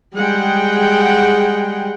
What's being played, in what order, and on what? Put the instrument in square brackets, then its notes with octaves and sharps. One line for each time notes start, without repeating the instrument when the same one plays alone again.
[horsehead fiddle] G3 G#3 [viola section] G#4 F#5 G5